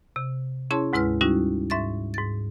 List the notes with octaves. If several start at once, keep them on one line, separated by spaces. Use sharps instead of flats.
C3
C#4 E4 G#4 C#5 A5 C6
D2 G#2 G#3 E4 B4 F6
G3 C#4 D#4 E4 F#4
G#2 E5 C#6 A6
G#2 A6